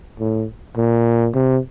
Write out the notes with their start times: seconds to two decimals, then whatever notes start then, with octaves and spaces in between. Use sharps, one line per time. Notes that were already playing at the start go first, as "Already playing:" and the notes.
0.20 A2
0.77 A#2
1.34 C3